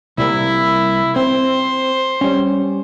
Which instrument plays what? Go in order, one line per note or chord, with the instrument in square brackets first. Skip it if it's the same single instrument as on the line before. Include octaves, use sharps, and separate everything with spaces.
[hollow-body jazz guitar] C2 G3 A#3 [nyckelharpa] E4
[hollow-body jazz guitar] C4 [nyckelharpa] C5
[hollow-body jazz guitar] G3 C#4